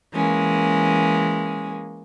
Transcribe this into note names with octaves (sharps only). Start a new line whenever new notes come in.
E3 G#3 A#3 C#4